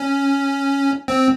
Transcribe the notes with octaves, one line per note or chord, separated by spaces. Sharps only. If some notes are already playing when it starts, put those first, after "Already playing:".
Already playing: C#4
C4